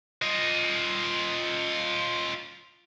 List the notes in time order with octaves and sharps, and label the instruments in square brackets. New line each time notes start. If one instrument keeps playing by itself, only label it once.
[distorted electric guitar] F4 D#5